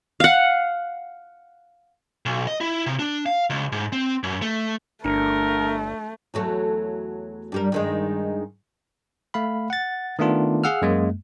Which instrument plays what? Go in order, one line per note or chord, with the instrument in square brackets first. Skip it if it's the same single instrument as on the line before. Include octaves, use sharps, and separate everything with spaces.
[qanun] F5 F#5
[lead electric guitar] B1
D#5
E4
C3
D4
F5
C#2
G#2
C4
F#2
A3
[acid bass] G1 [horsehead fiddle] A3 [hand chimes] D4 C#7 [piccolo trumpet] A#4
[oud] E2 F#3 A3
G2 G3 A#4
G2 D#3 G#3
[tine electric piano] A3 F5 B5
F#5 A6
D#3 A3 B3 D4 F4
G#4 F5 F#5 E6 F6
F#2 G#3 A#3